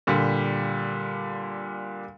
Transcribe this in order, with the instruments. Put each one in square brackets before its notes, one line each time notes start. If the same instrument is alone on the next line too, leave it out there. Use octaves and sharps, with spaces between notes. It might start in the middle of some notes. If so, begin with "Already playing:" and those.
[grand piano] A#2 D3 G3